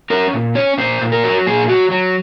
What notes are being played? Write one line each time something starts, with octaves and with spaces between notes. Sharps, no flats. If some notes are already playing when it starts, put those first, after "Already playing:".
C#4 A#4
A#2
C#4 C#5
A#2 C5
A#2
A#4
F#3
A#2 G#4
F#3 F#4
F#3